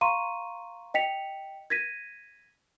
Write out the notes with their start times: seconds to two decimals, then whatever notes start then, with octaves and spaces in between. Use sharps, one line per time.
0.01 F5 A#5 C6 C#6 D#7
0.94 D#5 G5 B6 C#7 F7
1.70 G#6 A#6 B6 D#7